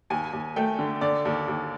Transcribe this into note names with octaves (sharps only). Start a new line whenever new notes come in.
D#2 G#5
D#2
A3 G5
D3
D3 D5
D#2
D#2